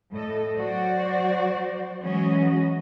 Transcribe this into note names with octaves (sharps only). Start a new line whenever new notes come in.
A2 A4 D#5
F#3 F#4 C5 D5
E3 F#3 G#3 C#4 F#4 D#5